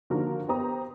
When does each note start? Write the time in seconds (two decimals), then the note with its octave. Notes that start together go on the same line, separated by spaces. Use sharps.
0.10 D3 D#3 F3 A#3 F#4 A#4
0.48 B3 G4 C5 A#5 D#6